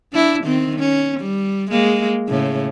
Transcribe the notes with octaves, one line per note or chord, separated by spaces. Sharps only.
D4 E4
D#3 C4
C#4
G3
G#3 A#3
A2 C#3